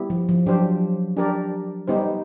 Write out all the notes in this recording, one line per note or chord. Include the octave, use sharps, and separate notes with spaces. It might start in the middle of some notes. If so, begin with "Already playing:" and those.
Already playing: G3 B3 E4 G4
F3
F3
F#3 D4 G4 C5
D4 G4 A#4 D5
G3 B3 D#4 G4 C5